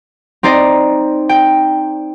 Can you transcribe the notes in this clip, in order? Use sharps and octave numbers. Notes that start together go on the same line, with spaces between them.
C4 D#4 C5 D5 A#6
G5